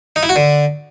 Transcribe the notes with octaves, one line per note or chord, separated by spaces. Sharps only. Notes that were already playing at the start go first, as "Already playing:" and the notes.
D#4
E4
F#4
D3